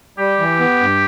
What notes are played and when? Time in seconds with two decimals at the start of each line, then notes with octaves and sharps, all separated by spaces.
0.18 G3 G4
0.39 E3
0.60 B3
0.80 G2